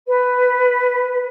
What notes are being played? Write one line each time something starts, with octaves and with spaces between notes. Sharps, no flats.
B4